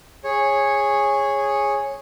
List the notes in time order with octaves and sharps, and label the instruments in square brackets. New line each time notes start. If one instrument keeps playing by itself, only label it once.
[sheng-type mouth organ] G#4 C#5